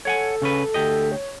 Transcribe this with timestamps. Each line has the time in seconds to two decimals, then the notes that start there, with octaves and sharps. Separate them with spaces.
0.05 A4 C#5 F#5 G#5
0.42 C#3 C#4 B4
0.74 D2 G4 D#5
1.12 C#5